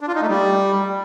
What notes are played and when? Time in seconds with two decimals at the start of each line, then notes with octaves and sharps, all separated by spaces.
0.01 D4
0.08 F4
0.15 D#4
0.22 A3
0.29 G3